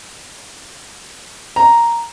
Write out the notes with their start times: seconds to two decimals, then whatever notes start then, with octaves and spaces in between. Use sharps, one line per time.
1.56 A#5